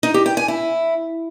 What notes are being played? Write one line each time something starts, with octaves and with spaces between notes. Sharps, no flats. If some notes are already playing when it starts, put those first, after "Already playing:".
D#4
G4
G5
G#5
E4